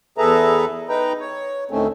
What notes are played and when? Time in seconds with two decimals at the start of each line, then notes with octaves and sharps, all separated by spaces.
0.18 E2 G#4 A4 B4 E5 A#5
0.89 D#4 B4 G5 A#5
1.20 C#5
1.71 D2 A2 D#3 A3 C4 C#4